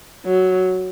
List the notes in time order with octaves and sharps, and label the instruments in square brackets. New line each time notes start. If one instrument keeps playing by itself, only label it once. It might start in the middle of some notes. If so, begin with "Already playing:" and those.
[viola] F#3